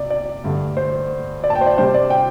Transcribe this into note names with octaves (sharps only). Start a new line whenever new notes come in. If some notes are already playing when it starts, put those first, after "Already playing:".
Already playing: C3 D5
D5
G2 D3 A3
C5
D5
A5
G5
C5
D5
C3 G3 D4 C5
D5
G5